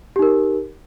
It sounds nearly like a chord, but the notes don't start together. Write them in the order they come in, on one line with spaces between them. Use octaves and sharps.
G4 D#4 A#4